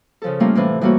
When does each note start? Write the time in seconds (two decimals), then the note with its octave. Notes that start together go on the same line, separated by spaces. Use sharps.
0.22 C#3 F3 A4
0.40 G3 A3 A#3 C#4 F4 A#4
0.55 A2 C3 E3
0.81 E3 G3 A3 A#3 F#4 C#5